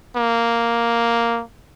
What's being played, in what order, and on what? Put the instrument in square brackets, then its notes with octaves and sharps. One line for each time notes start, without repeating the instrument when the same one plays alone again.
[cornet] A#3